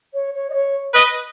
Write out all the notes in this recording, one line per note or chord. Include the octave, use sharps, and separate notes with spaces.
C#5
C#5
D#5
C#5
B4 D#5